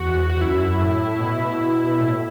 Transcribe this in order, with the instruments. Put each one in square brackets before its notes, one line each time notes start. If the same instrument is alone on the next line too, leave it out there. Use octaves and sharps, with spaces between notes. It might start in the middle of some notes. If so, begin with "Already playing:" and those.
Already playing: [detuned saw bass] E2 [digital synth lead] F#4
[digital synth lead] F#4
[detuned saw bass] E2
[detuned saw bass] F#2 [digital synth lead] E4
[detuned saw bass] A2
B2
B2
A2